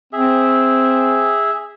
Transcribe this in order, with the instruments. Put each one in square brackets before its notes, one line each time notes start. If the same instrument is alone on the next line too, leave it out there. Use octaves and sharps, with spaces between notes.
[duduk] C4 [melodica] G#4 E5